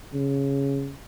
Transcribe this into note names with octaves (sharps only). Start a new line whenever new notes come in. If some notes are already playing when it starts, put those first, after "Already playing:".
C#3